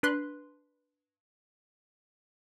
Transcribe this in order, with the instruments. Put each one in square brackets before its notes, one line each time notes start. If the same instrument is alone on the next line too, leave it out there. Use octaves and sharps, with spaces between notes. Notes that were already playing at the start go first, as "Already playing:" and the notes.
[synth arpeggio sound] D4 B4 C6 F#6